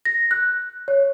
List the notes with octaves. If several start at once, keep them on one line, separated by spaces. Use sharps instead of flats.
A#6
F#6
C#5